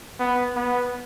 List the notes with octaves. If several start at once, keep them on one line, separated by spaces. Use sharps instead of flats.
B3
B3